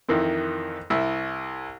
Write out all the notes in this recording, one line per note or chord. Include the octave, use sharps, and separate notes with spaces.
F2 D#3 E3 C4
C2 E4 E6